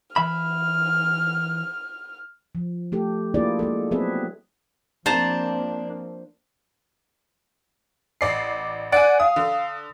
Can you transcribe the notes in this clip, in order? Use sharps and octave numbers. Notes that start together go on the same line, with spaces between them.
E3 E5 B5 F6
F3
A3 G4 A4
A#3 D4 E4 F4 G#4 D5
G#3 A#3 A4
F#3 B3 C4 G#4 B4 E5
F3 A#3 C4 D4 C5 A5 A#5
A1 D5 C7
D5 F#5 G#5
F5 D#6
D3